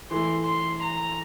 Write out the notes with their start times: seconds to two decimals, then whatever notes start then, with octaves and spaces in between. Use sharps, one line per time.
0.11 E3 A3 E4 C6
0.46 C6
0.83 A#5